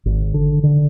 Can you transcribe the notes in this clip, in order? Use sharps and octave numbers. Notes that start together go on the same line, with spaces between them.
G#1
D3
D3